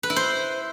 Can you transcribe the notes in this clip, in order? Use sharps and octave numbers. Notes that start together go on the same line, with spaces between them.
B4
E4
C5